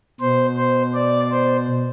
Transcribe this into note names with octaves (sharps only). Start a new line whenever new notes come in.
B2 C5
C5
D5
C5